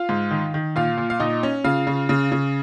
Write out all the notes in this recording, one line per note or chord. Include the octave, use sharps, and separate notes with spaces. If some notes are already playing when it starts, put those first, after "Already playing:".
Already playing: F4 F5
G#2
D#3
D#3
A#2 F4 F5
A#2
F5
A#2 D#4 D#5
C#4
C#3 F4 F5
C#3
C#3
C#3